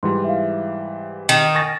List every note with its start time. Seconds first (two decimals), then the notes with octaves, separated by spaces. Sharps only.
0.03 G#2 E3 G3 E4 F4 C6
0.24 E5 F5
1.29 D#3
1.55 G#5 C#6 A6 A#6